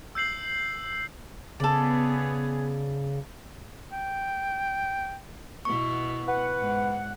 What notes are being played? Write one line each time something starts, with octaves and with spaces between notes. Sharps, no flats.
E6 G6 C7 F#7
C#3 B3 G#4 A4 D5
G5
B2 B3 E4 C#6
B4 F#5
G#2